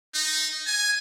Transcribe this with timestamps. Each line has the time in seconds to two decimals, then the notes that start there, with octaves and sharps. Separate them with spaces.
0.15 D#4
0.67 G#5